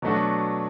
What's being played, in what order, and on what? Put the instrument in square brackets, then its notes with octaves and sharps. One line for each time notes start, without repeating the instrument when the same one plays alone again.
[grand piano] B2 F#3 A3 D4 F#4